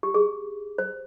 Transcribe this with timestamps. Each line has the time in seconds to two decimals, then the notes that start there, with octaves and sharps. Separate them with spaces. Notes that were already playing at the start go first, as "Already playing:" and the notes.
0.03 G4
0.14 G#4
0.78 C5